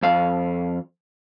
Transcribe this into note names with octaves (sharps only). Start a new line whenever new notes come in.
F2 F5